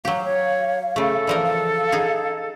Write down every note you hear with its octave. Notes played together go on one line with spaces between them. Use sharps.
F#3 G4 F5
C#5
C#3 A3 A4
E3 F3 A#4 D5
F5
D#4 G#4